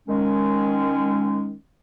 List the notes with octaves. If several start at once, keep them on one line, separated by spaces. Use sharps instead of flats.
D#3 G#3 C#4